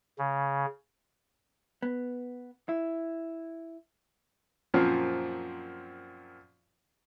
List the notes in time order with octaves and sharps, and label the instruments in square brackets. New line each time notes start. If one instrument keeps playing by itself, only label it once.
[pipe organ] C#3
[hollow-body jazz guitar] B3
E4
[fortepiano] F#2 A#2 F3 C4